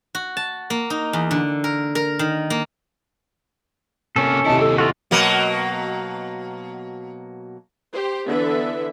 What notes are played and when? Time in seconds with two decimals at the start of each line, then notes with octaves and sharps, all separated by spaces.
0.15 F#4
0.37 A5
0.70 A#3
0.90 D#4
1.13 E2
1.31 D3
1.64 A#4
1.95 A#4
2.19 D#3
2.50 A#3
4.16 C3 A#3 C#4 A4
4.45 D#2 C3 E4 D#5 A5
4.60 A4
4.78 F4 F#4 A4
5.11 B2 F#3 A#3
7.92 G4 C5
8.27 D3 E3 B3 E5